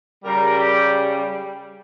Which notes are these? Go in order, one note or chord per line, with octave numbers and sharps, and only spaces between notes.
C#3 G3 A#4
G4